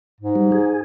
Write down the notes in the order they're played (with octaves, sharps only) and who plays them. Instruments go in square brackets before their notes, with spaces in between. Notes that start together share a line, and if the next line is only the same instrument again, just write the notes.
[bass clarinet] G#2
[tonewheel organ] G3
G#4